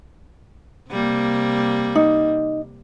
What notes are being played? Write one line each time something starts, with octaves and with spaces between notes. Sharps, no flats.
C3 G3 A#3
D#4